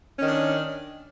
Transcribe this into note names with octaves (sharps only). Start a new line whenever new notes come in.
D#3 C#4 D4